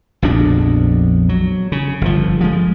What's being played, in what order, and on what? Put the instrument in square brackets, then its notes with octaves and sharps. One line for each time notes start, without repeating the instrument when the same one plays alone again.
[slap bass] A#1 F2 B2 D4
F#3
C#3
G1 F3
F3 G#3